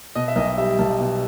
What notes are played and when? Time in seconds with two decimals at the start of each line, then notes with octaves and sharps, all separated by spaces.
0.15 B2 D#5
0.28 E5
0.36 B1 D#5
0.58 G3 E5
0.79 B1 A5
1.00 B2